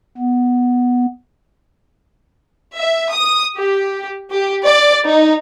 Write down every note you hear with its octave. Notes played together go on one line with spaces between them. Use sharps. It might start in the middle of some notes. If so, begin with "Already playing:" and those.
B3
E5
D#6
G4
G4
D5
D#4